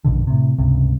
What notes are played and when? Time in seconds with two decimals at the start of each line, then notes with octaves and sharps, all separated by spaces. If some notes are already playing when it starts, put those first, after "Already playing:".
0.05 A#1 F#2 B2 D3
0.27 A2 C3
0.59 C#2 G2 C3